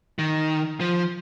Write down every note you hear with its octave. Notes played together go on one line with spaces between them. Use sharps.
D#3
F3